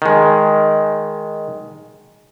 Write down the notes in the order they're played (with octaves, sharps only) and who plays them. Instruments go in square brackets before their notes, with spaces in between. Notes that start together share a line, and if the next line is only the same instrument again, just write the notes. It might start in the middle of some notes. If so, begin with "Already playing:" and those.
[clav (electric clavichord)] D#3 G#3